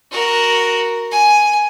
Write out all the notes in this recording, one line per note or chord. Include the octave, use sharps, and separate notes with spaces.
F#4 A#4
G#5